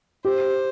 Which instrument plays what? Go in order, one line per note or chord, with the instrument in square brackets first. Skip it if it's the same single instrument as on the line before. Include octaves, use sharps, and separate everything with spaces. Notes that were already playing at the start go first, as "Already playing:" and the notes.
[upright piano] G4 [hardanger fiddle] C5